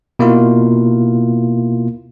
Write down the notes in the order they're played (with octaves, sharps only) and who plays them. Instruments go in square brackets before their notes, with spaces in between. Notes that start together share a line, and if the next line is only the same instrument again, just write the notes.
[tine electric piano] B2 A#3 E4 F4